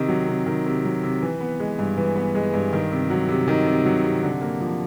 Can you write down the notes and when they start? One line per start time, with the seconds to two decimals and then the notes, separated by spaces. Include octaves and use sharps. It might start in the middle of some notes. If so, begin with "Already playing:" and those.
Already playing: C3 D#3
0.08 F#3
0.28 C3
0.46 D#3
0.66 C3
0.84 F#3
1.03 C3
1.22 E3
1.41 B3
1.60 G#3
1.79 G2
1.97 E3
2.16 B3
2.35 G#3
2.54 G2
2.73 D#3
2.91 C3
3.10 F#3
3.28 C3
3.48 D#3
3.66 C3
3.85 F#3
4.04 C3
4.23 D3
4.42 A#3
4.60 F3